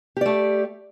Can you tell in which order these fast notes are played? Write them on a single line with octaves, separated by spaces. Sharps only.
G4 D5 A3